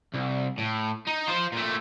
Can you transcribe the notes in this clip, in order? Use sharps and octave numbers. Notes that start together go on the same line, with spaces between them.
C2
A2
D#4
F4 C5
A#2 A3